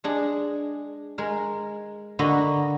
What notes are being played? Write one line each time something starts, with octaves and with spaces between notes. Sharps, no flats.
G#3 D4 G#4
G#3 A#4
D3 A#3 F#4 B4 D#5